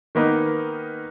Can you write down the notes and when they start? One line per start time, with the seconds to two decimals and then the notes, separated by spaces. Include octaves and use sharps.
0.15 D#3 A#3 B3 D#4 B4